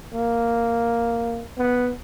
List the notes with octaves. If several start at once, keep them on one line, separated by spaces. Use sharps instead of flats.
A#3
B3